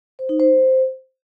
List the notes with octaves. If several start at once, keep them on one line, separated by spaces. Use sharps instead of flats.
C5
D#4
C5